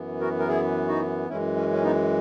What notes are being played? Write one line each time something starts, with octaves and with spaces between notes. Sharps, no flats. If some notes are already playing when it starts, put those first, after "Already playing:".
Already playing: F#2 E3 B3
F#4 A#4
A#4
E4 G#4
D#4 F#4
F#2 E3 G#3 C#4 E4
C#4
C#4
B3 D#4